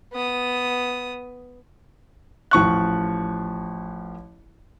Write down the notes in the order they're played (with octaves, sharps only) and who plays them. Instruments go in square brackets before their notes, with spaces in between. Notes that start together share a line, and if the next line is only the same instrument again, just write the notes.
[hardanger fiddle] B3 D#6
[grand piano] A1 F3 C#6 F#6